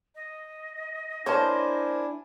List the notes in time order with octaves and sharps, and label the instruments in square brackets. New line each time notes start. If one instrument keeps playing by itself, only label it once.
[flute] D#5
[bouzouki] A#3 C5 [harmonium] D4 E4 G#5 [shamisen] C#5 A5